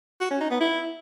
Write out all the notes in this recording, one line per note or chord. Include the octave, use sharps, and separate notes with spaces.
F#4
C#4
D#4
B3
E4